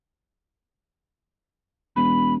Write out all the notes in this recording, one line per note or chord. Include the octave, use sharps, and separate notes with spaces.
E1 B5